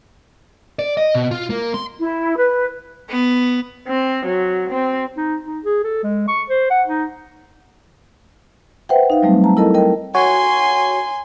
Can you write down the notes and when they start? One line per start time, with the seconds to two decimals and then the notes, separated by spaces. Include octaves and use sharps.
0.79 D5
0.97 D#5
1.15 B2
1.31 F4
1.50 A#3
1.74 C6
2.00 E4
2.36 B4
3.09 B3
3.88 C4
4.25 F#3
4.70 C4
5.17 D#4
5.46 D#4
5.64 G#4
5.84 A4
6.04 G#3
6.28 C#6
6.49 C5
6.71 F#5
6.87 D#4
8.89 B4 C5 E5 F#5 G5
9.10 D#4 F5
9.23 F#3 G3 A3 C4
9.44 A5 A#5
9.57 E4 A4 A#4 D#5 A5
9.74 A#4 D#5 G5
10.15 F#4 C#5 G#5 C6